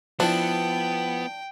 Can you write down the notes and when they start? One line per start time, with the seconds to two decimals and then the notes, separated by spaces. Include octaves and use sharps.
0.20 F3 B3 D4 E4 G5